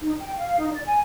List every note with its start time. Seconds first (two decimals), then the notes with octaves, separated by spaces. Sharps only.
0.01 D#4
0.20 G5
0.37 F5
0.59 D#4
0.72 D5
0.86 G#5